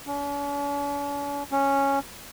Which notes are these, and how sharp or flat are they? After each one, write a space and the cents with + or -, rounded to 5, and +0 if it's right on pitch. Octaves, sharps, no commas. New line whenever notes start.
C#4 +45
C#4 -5